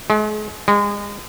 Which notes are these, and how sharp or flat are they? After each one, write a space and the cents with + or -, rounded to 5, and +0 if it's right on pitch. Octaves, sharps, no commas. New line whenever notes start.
G#3 +40
G#3 -30